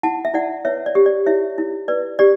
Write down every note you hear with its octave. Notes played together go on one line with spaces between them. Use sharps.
E4 F#5 A5
E5
E4 D5 F#5
B4 C#5 E5
D5
G4
D5
E4 C#5 E5
E4
B4 D5
G4 D5